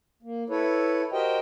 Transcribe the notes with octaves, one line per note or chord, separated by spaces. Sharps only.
A#3
E4 A4 B4 C#5
F#4 G4 A#4 C5 D#5 G5